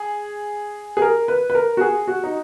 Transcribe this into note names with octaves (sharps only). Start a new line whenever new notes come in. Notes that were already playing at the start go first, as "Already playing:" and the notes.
Already playing: G#4
G#4
A#4
B4
B4
A#4
F#4
G#4
F#4
D#4